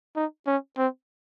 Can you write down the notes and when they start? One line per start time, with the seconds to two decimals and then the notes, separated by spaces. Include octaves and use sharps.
0.16 D#4
0.47 C#4
0.78 C4